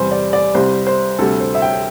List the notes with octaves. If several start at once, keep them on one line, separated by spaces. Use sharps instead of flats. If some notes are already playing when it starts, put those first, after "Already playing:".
Already playing: E2 C3 G3 C5
D5
D5
C2 C3 G3 C5
C5
D2 C3 G3 A4
C5
E5
G5